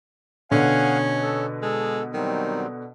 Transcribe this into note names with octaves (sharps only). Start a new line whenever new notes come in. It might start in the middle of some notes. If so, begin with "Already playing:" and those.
B2 D3 C#4 F5 F#5 G#5
A4
G#3 A4
D#3 F#3 G3 C4